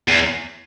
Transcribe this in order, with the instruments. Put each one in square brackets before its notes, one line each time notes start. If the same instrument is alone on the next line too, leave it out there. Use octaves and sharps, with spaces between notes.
[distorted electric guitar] E2